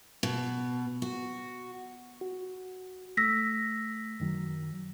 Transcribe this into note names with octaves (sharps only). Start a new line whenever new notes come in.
B2
F#4
F#4
A3 E6 A#6 B6
F#2 D#3 F#3